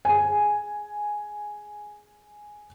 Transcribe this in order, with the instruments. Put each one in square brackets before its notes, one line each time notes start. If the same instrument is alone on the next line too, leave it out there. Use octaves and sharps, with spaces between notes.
[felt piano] G#4 G#5